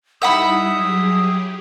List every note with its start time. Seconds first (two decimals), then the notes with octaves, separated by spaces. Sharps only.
0.22 G3 D#4 E4 E5 F#5 B5 D#6
0.77 F#3 G4 G#4